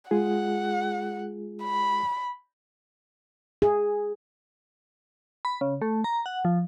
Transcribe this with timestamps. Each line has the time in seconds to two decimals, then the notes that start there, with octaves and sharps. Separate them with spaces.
0.11 G#3 F4 G#4 F#5
1.64 B5
3.62 G#4
5.45 B5
5.61 C#3
5.82 A3
6.04 A#5
6.26 F#5
6.45 F3